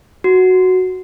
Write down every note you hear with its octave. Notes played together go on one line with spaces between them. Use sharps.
F#4